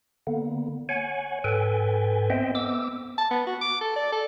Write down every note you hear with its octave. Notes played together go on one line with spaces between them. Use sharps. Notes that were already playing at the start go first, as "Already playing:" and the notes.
D3 A#3 B3
C#5 F#5 G#5
G#2 A4 B4 G5 G#5
B3 C4 C5 D#5 E5 G5
B3 D6 E6
A5
B3
F#4
D6
A4
D5
A4